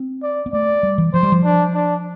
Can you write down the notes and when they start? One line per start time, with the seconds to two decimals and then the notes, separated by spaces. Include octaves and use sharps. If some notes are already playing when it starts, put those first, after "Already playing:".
Already playing: C4
0.23 D5
0.46 B3
0.53 A3 D5
0.83 G3
0.98 E3
1.13 F3 C5
1.23 G3
1.32 F3
1.44 D4
1.74 D4